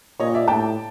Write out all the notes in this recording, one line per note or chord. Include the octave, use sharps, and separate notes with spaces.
A#2 C#5 D#5
D5 E5
A2 G5 A5